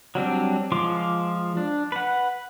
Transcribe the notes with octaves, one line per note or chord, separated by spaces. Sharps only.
F#3 G3 C4 D4
F3 G#3 F4 C6 D6
D4
B4 F#5